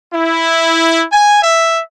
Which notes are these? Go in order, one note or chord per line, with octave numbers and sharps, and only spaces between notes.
E4
G#5
E5